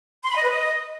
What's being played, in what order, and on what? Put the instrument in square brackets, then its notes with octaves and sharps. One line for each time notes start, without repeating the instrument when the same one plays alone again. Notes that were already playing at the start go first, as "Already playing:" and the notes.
[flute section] C6
B5
D#5
B4
D#5